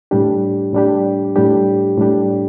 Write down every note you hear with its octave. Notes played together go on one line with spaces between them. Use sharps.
A2 G3 D4 G4
A2 G3 D4 G4
A2 G3 D4 G4
A2 G3 D4 G4